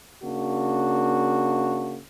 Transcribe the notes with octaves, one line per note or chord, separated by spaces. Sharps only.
C#3 A#3 D4 F#4